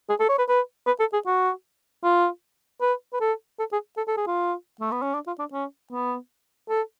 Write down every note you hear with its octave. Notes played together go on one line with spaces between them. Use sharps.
G#4
A4
C#5
B4
B4
B4
A4
G#4
F#4
F4
B4
B4
A4
A4
G#4
A4
A4
G#4
F4
A3
B3
C#4
D4
F4
D4
C#4
B3
A4